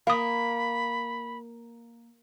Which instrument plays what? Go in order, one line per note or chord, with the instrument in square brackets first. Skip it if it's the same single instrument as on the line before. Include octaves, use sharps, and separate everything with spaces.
[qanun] A#3 [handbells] F5 D#6 [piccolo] B5